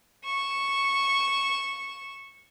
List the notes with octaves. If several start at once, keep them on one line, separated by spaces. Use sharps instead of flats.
C#6 E7